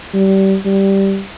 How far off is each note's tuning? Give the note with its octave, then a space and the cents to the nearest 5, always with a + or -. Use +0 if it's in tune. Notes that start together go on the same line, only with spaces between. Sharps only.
G3 -25
G3 -5